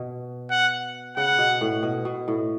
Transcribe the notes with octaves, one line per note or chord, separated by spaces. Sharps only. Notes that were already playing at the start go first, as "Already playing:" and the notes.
Already playing: B2
F#5
C#3 F#5
B2
A2
B2
B2
A2